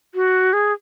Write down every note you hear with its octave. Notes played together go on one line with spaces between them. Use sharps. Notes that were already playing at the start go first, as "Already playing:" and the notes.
F#4
G#4